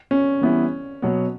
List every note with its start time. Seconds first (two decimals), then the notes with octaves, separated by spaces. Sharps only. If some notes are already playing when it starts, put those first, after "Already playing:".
0.11 C#4
0.41 E3 G3 B3 E4
1.02 B2 F#3 B3